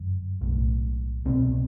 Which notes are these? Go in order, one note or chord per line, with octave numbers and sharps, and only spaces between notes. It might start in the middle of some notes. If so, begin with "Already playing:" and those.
Already playing: G1 F#2
B1 A2
C2 B2 C4